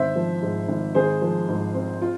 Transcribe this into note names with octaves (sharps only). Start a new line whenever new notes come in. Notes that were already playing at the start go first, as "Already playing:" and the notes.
Already playing: G#1 C5 E5
F3
G#2
G#1
G#1 G#4 C5
F3
G#2
C4
F4